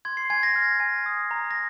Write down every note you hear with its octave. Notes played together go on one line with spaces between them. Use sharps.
C6 G#6
C7
G#5 G#6
A#6
F6
G#5
D#6
A#5
A#6